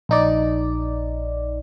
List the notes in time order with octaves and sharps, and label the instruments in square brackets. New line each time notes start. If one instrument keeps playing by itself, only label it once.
[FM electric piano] A#1 D#4 D5